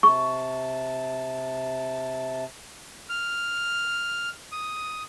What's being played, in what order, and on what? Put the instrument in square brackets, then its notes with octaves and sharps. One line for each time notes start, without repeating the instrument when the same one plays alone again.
[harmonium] C3 A5 [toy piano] C#6
[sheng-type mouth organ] F6
D#6